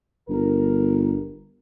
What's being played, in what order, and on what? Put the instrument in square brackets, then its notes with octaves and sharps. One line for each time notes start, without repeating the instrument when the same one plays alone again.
[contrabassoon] G1 [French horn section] A#4